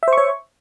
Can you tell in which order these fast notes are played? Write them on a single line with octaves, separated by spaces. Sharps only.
E5 C5 C#6 C#5